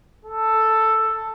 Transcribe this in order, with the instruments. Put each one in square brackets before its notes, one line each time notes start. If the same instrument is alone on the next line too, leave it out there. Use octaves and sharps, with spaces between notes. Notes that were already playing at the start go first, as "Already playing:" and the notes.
[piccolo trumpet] A4